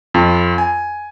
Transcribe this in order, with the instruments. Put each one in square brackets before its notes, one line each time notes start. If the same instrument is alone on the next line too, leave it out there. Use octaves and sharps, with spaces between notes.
[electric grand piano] F2 F4
G#5